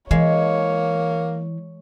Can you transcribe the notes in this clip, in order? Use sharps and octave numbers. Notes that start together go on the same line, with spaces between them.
E3 G#3 A#3 C#5